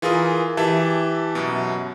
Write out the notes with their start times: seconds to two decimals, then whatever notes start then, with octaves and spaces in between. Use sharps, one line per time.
0.02 E3 F4 G#4 A#4 D#6
0.57 E3 G4 E5 A5
1.35 F#2 B2